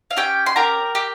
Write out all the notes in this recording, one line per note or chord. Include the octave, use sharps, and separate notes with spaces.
F5
C#4 G4 G5
C6
G4 A#4 A#5
G4